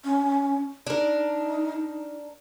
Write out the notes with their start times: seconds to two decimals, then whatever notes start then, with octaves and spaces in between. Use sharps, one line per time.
0.05 C#4
0.87 D4 D#4 A#4